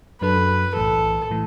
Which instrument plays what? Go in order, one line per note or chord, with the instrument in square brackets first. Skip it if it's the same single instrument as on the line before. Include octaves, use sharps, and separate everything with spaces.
[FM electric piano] F#2 F#3 D4 A4 [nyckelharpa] B4
[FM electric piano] B1 A2 E3 [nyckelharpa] A4
[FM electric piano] A2 E3 A3